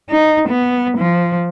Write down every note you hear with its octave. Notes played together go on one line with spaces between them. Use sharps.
D#4
B3
F3